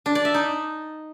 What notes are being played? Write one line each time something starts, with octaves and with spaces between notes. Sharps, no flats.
D4
D5
E5
D#4